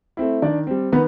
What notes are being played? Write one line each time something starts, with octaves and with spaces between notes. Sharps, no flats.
A3 C4 E4
D#3 D4 D5
G3 C4
D#3 B3 B4